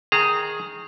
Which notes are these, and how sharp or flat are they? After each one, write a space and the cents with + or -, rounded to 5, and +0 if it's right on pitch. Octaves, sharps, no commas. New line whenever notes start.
D#3 +0 G#4 +0 A#5 -25